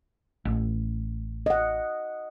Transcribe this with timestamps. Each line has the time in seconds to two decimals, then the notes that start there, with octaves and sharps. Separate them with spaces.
0.45 A1
1.46 D#5 F#5